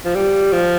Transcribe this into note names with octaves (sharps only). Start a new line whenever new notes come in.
F3
G3
F3